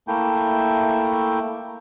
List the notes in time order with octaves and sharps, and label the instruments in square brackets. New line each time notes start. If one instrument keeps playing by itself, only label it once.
[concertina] A3 A#3 E4 G5